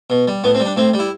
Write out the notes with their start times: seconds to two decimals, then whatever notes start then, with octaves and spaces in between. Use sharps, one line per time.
0.10 B2
0.28 G3
0.44 A2 B3
0.55 C4
0.60 G3
0.66 D4
0.76 A2 C4
0.94 G3
0.99 E4